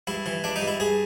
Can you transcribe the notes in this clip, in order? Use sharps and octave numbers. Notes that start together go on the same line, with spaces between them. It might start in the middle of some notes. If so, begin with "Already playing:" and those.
G2 E4
E3
G2 D4
D#4
G2
E4
G2 G#4